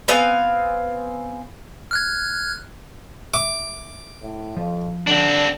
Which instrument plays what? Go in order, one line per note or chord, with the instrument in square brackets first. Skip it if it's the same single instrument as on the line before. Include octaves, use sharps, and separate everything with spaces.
[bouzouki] B3 C4 F5 G#5
[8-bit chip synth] F6 F#6 G#6
[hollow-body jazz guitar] E5 [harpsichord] D6
[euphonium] A2
[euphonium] F2 [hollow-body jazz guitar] F3
[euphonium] D3 [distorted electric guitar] C4 D4